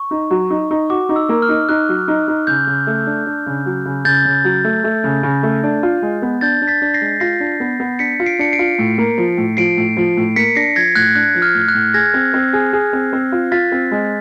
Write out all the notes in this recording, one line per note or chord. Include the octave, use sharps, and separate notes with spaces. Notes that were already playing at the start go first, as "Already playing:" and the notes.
Already playing: C#6
D#4
F#3
D#4
D#4
F#4 D6
D#4
E6
A#3
F6
D#4
D#4 F#6
F#3
D#4
D#4
C#3 G6
C#3
A3
D4
D4
C#3
F#3
C#3
C#3 G6 A6
C#3
F#3
A3
A3
C#3
C#3
A3
D4
F4
G#3
B3
D4 G6 A6
D4
A6 B6
D4
A#6 C7
G#3
F4 A#6 C7
D4
B3
B3
D4 B6 C#7
F4
C7 D7
D4 C#7
C7 D7
F4
A2
A#3
F3
A2
F3 C7 D7
A2
F3
A2
A#3 B6 C#7
D4 A#6 C7
F3 G#6 A#6
A2 F#6 G#6
D4 F#6
F3
F6
A2
F#6
A2
G#4 G#6 A#6
C4
C4
G#4
G#4
C4
C4
F4
F4 A6 B6
C4
G#3